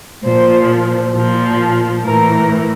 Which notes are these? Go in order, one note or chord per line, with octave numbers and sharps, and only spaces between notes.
A#2 F3 C5
A#2 F3
A2 E3 A#4